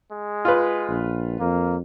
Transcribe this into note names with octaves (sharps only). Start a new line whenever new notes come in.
G#3
F4 B4
A#1
F2 A#3